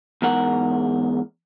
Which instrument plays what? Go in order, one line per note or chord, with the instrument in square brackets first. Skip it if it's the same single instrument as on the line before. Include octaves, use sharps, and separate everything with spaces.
[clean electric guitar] E2 G#2 A#4 F#5